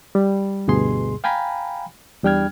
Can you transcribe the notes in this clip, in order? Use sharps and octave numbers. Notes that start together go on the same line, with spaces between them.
G3
D2 G2 B2 G#4 C6
F5 G5 G#5 A#5 B5
E2 G3 D4 G5 F6 G#6